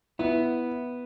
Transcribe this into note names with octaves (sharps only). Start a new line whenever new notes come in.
B3 E4